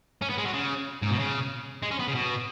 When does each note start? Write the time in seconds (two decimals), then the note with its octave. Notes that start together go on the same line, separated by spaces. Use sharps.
0.22 C#4
0.30 B3
0.38 G#3
0.46 F#3
0.54 C#3
1.02 G#2
1.11 B2
1.19 C#3
1.83 G#3
1.91 C#4
2.00 B3
2.08 C#3
2.15 B2